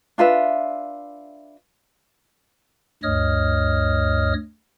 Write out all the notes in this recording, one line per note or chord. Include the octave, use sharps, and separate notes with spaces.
D4 F4 B4 E5
D2 G2 C#5 D#5 D#6 F6